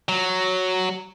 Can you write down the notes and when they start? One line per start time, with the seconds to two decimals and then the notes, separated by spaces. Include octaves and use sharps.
0.09 F#3